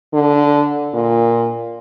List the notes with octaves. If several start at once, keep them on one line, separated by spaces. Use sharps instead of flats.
D3
A#2